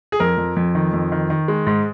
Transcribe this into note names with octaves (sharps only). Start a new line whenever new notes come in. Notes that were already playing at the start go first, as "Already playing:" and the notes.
G#4
F2 A#4
F2
F2
D#3
F2
D#3
D#3
G#3
G#2